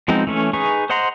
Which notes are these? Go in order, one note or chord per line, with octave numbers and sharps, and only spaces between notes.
F3 G#3 B3 C4 D#4
E3 A3 C#4
D#4 G#4 B4 C#6
C5 D#5 F#5 A#5 C6